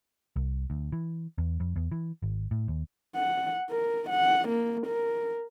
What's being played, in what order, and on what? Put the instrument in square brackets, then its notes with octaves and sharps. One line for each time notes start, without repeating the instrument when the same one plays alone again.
[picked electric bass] C2
D2
E3
E2
F2
E2
E3
G#1
A2
D#2
[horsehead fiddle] F#5
A#4
F#5
A#3
A#4